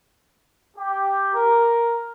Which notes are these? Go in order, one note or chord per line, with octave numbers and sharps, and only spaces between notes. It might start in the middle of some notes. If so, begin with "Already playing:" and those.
G4
A#4